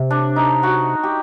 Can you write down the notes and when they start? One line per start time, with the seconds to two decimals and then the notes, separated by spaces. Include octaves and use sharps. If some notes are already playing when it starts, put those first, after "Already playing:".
Already playing: C3
0.10 D4
0.36 D#4
0.63 F#4
1.03 G4